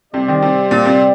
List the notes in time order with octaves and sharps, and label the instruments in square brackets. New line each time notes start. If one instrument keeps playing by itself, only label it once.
[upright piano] C3 [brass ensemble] G3 C4 G4 D5
[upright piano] D#3
C3
A#2
C3